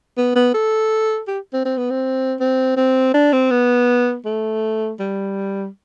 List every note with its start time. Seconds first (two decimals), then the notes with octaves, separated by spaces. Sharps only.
0.17 B3
0.36 B3
0.54 A4
1.28 G4
1.53 C4
1.65 C4
1.77 B3
1.90 C4
2.40 C4
2.77 C4
3.14 D4
3.33 C4
3.51 B3
4.25 A3
5.00 G3